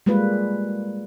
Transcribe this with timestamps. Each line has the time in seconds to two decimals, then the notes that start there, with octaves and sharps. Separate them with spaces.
0.06 G3 G#3 A#3 F4 B4